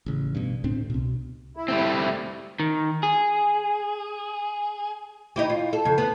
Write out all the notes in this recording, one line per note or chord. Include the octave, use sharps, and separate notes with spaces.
A1 C#3
G2 B2
D2 A2 C4 D4
C2 B2
E4
G3 A3 C4
D#3
G#4
D#4 E4 G4
F4
A4
F2 C#3
B3